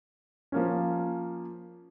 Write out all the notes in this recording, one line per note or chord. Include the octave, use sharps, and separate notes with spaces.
F3 A#3 C#4